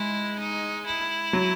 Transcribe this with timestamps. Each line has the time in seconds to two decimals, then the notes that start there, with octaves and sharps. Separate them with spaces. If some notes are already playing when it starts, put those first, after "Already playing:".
Already playing: G#3 E4
0.39 D#4
0.86 E4
1.33 F#3